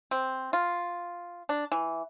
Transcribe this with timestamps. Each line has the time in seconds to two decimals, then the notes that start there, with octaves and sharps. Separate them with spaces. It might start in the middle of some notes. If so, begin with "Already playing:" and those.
0.11 C4
0.53 F4
1.49 D4
1.72 E3